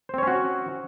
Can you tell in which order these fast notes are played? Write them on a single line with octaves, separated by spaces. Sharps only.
C5 C4 C#5 C#4 F#4